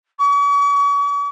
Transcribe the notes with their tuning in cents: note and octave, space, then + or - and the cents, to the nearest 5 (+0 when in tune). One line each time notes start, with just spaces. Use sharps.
C#6 +45